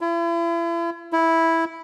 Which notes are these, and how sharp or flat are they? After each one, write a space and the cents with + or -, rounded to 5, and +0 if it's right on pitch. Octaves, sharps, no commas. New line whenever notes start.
E4 +40
E4 -5